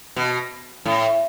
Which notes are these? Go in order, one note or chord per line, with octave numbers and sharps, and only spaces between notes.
B2
A2